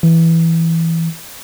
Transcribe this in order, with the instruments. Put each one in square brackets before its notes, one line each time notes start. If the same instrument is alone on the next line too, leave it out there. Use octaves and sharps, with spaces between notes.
[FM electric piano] E3